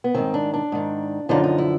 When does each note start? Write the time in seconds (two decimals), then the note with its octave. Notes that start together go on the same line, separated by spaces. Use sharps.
0.04 B3
0.15 G#2 D#3 C4
0.34 D4
0.54 D4
0.72 G#2 D#3
1.29 F#2 D3 F3 D#4
1.44 D#4
1.58 E4